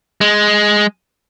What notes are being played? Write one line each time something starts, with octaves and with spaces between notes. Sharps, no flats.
G#3